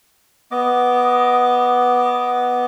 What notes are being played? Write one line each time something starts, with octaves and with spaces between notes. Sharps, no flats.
B3 D#5 D6